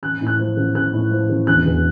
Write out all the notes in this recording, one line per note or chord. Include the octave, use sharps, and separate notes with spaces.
A1 F#6
A2
F#6
F3
A1
A1 F#6
A2
F3
A1
E1 F#6
E2